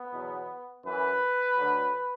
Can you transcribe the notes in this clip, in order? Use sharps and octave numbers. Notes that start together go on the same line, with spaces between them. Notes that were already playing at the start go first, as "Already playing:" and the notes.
Already playing: B3
E2 B2 F#3
F#2 E3 B4
D2 D3 F#3